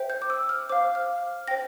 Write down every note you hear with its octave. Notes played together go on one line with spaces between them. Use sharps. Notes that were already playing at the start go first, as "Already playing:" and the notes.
Already playing: C5 E5 G5
G6
D6
E6
F6
C5 F5 D6
F6
C5 G5 A#6